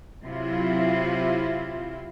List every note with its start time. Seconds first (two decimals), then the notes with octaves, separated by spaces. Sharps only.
0.25 C3 F#3 C4 E4 F4